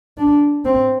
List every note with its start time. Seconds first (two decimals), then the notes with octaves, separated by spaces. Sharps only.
0.18 D4
0.65 C4